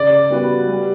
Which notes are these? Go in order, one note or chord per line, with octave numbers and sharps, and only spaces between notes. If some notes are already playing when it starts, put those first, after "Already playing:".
Already playing: C#3 D5
G3 B3 F#4 B4
G3